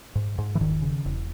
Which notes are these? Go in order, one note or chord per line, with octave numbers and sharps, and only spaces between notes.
G#2
G#2
E3
E1 D#3
C#3
E1